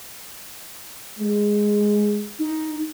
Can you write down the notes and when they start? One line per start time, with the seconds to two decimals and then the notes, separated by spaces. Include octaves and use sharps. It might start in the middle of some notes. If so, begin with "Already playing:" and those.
1.19 G#3
2.39 D#4